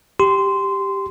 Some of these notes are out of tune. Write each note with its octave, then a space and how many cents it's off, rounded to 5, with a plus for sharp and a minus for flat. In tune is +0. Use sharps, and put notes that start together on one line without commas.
G4 +0 C6 -15